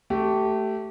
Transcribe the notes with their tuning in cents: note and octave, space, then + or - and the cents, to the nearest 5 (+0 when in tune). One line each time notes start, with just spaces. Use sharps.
A3 +0 G4 -25